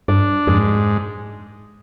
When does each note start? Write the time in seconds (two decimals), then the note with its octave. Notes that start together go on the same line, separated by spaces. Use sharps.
0.08 G2 D4
0.47 F2 G#2